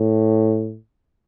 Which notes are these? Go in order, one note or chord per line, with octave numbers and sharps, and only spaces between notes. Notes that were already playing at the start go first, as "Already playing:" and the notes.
Already playing: A2